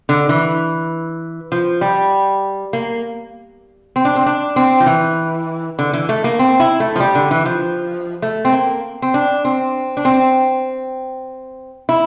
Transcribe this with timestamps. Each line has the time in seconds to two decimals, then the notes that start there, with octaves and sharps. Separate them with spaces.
0.09 D3
0.29 E3
1.52 F3
1.81 G3
2.73 A#3
3.96 C4
4.05 D4
4.16 C4
4.26 D4
4.56 C4
4.80 F3
4.86 E3
5.79 D3
5.93 E3
6.09 A3
6.24 A#3
6.39 C4
6.60 E4
6.80 A3
6.96 F3
7.00 G3
7.15 D3
7.31 E3
7.46 F3
8.22 A3
8.45 C4
8.52 A#3
9.02 C4
9.14 D4
9.45 C4
9.97 D4
10.05 C4
11.89 E4